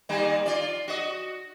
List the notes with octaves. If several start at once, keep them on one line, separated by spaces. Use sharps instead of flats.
D#3 G3 A#3
F4 D5
F#4 D#5